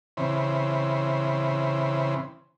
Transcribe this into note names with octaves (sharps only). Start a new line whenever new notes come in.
C#3 E3 C4